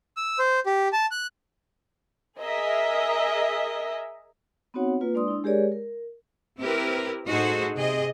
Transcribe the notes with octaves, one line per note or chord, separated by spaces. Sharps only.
E6
C5
G4
A5
F#6
G#4 A#4 D#5 E5
B3 C4 D#4 F#4 C#5 F#5
A#3 F4 B4
G#3 D4 D5 C6 D#6
D4 E4
G#3 G4 G#4 A#4 C#5 D5
A#4
C4 E4 G4 A#4 B4
A2 D#4 F#4 G#4 A4 C5
C3 G#4 D#5